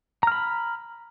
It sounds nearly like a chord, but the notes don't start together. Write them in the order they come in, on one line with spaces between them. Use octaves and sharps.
A#5 F6 B5